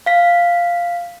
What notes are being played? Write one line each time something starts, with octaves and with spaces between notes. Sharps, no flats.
F5 B6